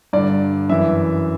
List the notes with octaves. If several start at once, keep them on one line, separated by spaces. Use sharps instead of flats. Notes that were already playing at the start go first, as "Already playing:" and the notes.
G2 D3 D5
F#2 E3 E5